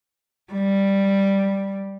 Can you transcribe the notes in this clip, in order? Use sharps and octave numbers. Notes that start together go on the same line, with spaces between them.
G3